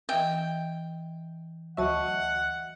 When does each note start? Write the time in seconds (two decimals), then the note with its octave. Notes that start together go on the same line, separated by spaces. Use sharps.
0.09 E3 D#5 E5 G5
1.77 D2 F#3 D#5 E5 F#5 A5 C#6